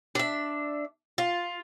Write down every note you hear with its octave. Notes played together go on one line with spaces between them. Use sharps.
D4 E5
F4